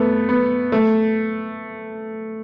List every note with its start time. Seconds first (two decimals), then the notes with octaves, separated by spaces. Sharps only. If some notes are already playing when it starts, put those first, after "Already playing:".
Already playing: A3 B3
0.29 B3
0.72 A3